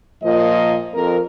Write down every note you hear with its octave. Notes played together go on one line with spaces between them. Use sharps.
A#2 F3 D#5
F2 A#4